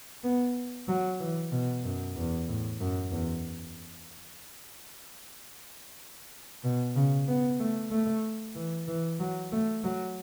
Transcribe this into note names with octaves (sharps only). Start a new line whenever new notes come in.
B3
F#3
E3
B2
F#2
E2
A2
F#2
E2
B2
C#3
B3
A3
A3
E3
E3
F#3
A3
F#3